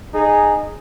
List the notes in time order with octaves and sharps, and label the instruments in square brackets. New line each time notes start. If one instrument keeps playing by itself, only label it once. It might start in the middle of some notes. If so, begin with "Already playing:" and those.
[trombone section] D#4 G#4